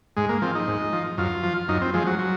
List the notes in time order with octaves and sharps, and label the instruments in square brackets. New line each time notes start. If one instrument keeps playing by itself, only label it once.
[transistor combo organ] G#2 G#3
A#3
F3 C4
D#4
G#2
F3
F#2 F4
F3
F#2 D#4
C4
F3 G#3
F#3
F#3